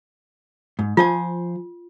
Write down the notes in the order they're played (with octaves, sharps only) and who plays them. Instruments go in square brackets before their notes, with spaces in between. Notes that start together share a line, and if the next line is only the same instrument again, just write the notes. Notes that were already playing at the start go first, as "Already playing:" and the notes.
[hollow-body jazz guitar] G#2
[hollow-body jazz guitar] F3 C5 G#5 [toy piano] F4